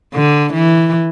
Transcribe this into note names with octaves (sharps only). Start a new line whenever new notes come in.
D3
E3